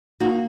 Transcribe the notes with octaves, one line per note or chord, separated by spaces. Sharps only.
A#3 D#4 F#4